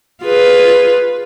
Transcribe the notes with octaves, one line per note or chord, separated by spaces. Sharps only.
F4 G#4 B4